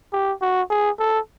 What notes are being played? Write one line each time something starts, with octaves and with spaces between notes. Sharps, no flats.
G4
F#4
G#4
A4